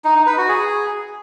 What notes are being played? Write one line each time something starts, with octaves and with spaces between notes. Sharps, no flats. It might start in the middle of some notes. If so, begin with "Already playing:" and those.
D#4
D#4
B4
F#4
G#4